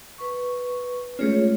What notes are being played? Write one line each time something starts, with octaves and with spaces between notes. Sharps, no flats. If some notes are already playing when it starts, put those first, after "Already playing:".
B4 C#6
G#3 A3 C#4 F4 G#4 C#5